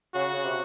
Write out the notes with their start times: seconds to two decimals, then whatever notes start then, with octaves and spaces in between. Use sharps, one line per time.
0.14 C#3 F#4
0.33 C#3
0.44 C3